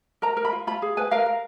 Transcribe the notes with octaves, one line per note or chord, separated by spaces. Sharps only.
A#4 A#5
A#4
B5
F4
F4 B5
G#4
B4 G#5
A#4 F5
A#4